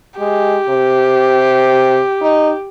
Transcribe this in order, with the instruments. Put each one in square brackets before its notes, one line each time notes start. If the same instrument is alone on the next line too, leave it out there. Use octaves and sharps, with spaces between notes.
[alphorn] G#3 [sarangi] G4
[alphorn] C3
D#4